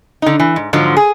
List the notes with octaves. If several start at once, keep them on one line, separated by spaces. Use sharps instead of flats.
D3 D#4
E3
G#2
G#2 D3 F3 F#3
G#4